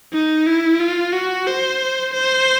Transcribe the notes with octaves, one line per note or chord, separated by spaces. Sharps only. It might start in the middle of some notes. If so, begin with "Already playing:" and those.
D#4
E4
F4
F#4
C5
C5